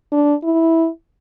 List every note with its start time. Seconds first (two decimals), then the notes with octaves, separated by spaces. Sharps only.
0.12 D4
0.44 E4